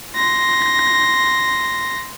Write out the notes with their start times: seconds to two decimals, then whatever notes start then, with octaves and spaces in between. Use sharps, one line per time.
0.16 C6 A#6